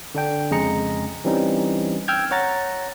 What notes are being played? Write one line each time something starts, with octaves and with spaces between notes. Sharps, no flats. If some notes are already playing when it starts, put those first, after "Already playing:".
D3 D4 G5
F2 C#3 G#3 G#4 A#5 C#7
E3 G3 C4 C#4 D#4
G5 E6 F6 G6 G#6
C#5 F#5 A#5 A6